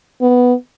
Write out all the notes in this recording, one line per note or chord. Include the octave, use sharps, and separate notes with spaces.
B3